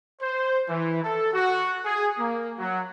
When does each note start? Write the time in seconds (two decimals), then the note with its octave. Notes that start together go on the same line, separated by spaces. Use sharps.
0.22 C5
0.69 E3
1.03 A4
1.34 F#4
1.85 G#4
2.19 A#3
2.59 F#3